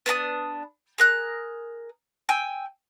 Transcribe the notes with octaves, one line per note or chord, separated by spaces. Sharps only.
B3 D4 A5 D#6
G#4 A#4 F#6
G5 G#5 E6